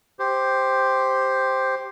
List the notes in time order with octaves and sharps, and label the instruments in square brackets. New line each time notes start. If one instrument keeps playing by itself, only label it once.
[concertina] G4 C5